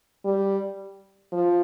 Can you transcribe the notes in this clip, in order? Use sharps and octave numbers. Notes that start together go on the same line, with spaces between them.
G3
F3